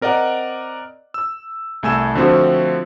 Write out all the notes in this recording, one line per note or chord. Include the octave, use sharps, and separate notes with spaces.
C4 A#4 D5 D#5 F#5
E6
C2 A3 G#5 E6 E7
D3 F3 A3 C4 F#4 C5